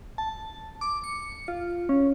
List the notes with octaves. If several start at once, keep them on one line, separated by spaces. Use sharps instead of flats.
A5
D6
C#7
F4
C#4